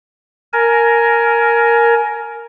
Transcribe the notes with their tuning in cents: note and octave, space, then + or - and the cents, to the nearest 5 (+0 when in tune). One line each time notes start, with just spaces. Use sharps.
A#4 +0 G#5 +20